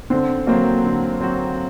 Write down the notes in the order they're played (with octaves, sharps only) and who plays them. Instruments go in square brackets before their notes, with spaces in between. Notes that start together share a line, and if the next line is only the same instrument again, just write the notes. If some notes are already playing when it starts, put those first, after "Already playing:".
[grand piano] D3 [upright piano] C4
[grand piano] F#3 C4 F#4 [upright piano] A#3
[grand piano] D3
F#3 C4 F#4